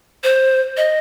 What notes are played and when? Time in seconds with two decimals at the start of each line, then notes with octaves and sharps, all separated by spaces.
0.24 C5
0.77 D#5